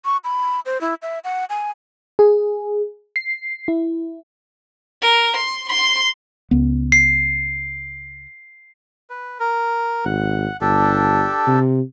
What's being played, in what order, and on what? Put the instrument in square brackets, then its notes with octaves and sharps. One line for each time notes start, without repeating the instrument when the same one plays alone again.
[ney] C#6
B5
C5
E4
E5
F#5
G#5
[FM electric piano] G#4
C7
E4
[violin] A#4
C6
C6
[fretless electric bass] C#2 B3
[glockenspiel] C7
[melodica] B4
A#4
[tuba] G#1 [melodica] F#5
[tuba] G1 [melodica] D4 G4 A4
[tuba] C3